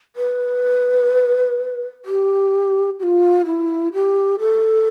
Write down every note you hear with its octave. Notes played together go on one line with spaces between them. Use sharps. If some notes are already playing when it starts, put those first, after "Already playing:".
B4
G4
G4
F4
E4
G4
A4